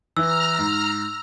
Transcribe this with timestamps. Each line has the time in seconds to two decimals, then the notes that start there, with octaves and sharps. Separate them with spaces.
0.17 E3 E4 A#5 E6 F6
0.59 G#2